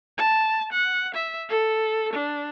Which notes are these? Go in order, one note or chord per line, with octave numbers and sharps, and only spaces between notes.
A5
F#5
E5
A4
D4